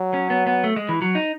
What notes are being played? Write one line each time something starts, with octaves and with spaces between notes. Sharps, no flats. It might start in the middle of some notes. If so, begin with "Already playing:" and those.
Already playing: F#3
C#4
B3
B3
A3
G#3
E3
F#3
D#4